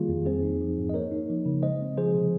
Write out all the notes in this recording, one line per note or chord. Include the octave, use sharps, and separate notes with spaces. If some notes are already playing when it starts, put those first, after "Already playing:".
Already playing: D#3 G3 A#3 F4 G#4
F2
C4 G#4 C5
D#4
F3
G#2
D#5
A#3 A#4 C#5
D#4
F3
C#3
G#3 C5 D#5
C4
F3 G#4 C5
C3